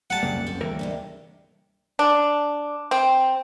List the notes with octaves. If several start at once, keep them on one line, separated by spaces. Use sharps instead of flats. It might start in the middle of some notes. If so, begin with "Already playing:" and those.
G3 A3 C4 F#5 A5
E1 C2 F#2 C#3 A#3
C4
D2 E3 G3 A#3 A#4 E5
G2 C3 G#3
D4
C4